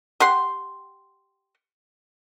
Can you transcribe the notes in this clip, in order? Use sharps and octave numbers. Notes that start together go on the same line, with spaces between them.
G4 F#5 C6